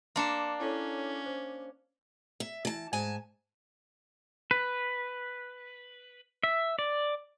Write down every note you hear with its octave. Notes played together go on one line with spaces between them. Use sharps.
A#3 D4 C6 C#7 E7
C#4 E4 A4 C#5
C5
E5
E3 A5
G#2 G#5 A5
B4
E5
D5